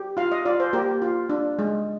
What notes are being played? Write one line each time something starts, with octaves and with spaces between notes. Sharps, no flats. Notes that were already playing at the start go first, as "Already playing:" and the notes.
Already playing: G4
F4 F5
D#5
F4 D5
C5
A#3 G4 A#4
F4
D4
G#3